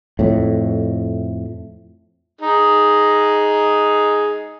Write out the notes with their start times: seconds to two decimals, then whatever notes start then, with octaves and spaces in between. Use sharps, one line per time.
0.19 F2 A2
2.41 D#4 G#4